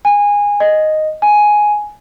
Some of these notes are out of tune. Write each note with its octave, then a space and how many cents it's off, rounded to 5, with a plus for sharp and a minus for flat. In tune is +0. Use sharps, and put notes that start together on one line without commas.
G#5 -20
D#5 -5
G#5 +5